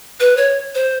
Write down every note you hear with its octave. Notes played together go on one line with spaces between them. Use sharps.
B4
C#5
C5